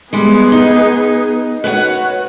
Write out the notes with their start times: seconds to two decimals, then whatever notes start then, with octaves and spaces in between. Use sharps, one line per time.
0.13 G3 G#3 B3 G#4
0.52 D#4
1.64 F#4 B4 C#5 F#5